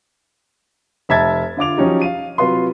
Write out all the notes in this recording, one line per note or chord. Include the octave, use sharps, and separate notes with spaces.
F1 E5 A5 G#6 A6
D3 F4 D6 F7
F3 F#3 C#4 D#4 G4
F5 D#7
C3 F#3 F4 B4 C6